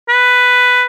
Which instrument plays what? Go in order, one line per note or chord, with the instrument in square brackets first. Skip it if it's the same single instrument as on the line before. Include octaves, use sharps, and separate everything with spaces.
[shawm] B4